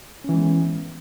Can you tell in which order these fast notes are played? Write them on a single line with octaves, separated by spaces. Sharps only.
C#4 E3 G#3 B3